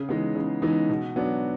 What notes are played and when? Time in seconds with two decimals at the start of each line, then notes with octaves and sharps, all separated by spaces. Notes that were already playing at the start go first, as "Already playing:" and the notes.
Already playing: C#3
0.09 E3 G#3 B3 D#4
0.35 C#3
0.62 E3 G#3 B3 D#4
0.89 B2
1.16 F#3 B3 D4